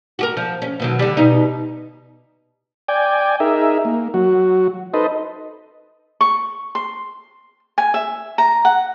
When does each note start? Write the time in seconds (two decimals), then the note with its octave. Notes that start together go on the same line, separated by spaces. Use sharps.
0.19 F#4 G4 A#4
0.37 F3
0.62 C#4
0.80 B2 D#3 F#3
0.99 D3 G3
1.17 B2 D#4
2.88 D5 G5 G#5
3.40 D#4 G#4 A#4 E5
3.85 A#3
4.14 F#3 F#4
4.94 D#4 A4 B4 C5 D#5
6.21 C#6
6.75 C6
7.78 G#5
7.94 E5
8.38 A#5
8.65 F#5